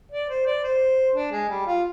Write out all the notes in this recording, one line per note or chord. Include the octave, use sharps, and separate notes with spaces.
D5
C5
D5
C5
D4
G#3
G3
F4